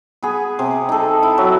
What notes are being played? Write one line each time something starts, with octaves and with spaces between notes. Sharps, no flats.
B3 G#4
C3
D#4 A4
E4
F#3